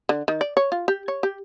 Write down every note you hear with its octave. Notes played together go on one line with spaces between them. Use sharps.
D3
D#3
D5
C#5
F4
G4
C#5
G4